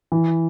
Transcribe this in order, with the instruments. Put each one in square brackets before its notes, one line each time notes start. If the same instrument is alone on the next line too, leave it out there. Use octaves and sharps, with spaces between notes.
[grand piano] E3